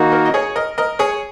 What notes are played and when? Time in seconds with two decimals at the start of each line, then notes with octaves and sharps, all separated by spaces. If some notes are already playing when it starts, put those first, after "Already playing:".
Already playing: D#3 A#3 D#4 F#4
0.12 A#4 D#5
0.26 D#5
0.34 G#4 C#5
0.56 A#4 D#5
0.78 A#4 D#5
0.99 G#4 C#5